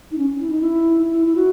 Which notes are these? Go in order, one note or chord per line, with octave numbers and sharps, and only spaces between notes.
D#4
C#4
E4
D#4
E4
E4
E4
F#4